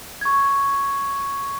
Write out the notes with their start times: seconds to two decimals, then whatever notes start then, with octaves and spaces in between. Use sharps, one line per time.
0.21 C#6 G#6